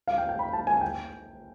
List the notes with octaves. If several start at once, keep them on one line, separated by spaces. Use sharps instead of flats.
F5
G5
G5
B5
A5
G#5
G5